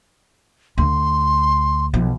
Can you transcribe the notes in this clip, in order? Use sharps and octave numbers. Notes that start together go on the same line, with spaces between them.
D2 C6
B1 F3